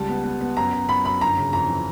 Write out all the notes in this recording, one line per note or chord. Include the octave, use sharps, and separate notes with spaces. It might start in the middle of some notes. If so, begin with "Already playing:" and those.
Already playing: C#2 G3 A5
B3
B3
B3
F#2 A#5
F#2
F#2 B5
F#2 B5
G1 A#5
C#3
F2 A#5
E3